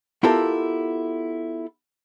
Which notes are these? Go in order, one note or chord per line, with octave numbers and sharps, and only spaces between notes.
B3 E4 F4 G4 A4 A#4